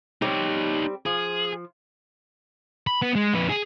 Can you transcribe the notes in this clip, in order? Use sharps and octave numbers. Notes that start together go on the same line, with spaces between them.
G3 C4 D#4 C#5
F3 G#4
B5
B3
G#3
F2 B4
G#4